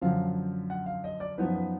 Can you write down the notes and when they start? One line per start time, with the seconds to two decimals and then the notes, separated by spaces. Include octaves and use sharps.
0.01 F#2 D3 F3 F5
0.70 F#5
0.86 F5
1.04 D#5
1.20 D5
1.38 F#2 F3 B3 D#4 B4
1.55 B4